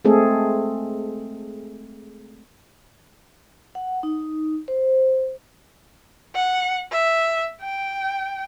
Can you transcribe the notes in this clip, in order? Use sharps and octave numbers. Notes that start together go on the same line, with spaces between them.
G#3 A3 C4 G#4 A4
F#5
D#4
C5
F#5
E5
G5